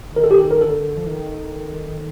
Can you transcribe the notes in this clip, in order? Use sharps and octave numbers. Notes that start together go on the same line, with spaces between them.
D3
D#3 A#4
A4
G4
A4
A#4
D3 A4
F3
D#3